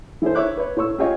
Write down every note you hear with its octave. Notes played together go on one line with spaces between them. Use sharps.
E3 E4 G#4 A4 C5
E4 C#5 E5 D6 F#6
B4 C#5
A2 C#5 C#6 E6
C#4 F4 G4 G#4 C#5 D#5